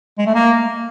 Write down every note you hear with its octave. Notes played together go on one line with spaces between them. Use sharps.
G#3
A3
A#3